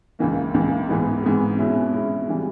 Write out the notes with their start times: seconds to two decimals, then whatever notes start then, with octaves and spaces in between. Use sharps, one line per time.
0.19 C#2 C#3 E3 A#3
0.54 C#2 C#3 E3 A#3
0.89 G#2 E3 G#3 B3
1.23 G#2 E3 G#3 B3
1.58 B2 G#3 C#4 E4
1.93 B2 G#3 C#4 E4
2.28 C#3 E3 G3